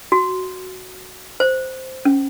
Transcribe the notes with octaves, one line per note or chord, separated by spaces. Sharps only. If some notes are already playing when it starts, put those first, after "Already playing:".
F#4
C5
C#4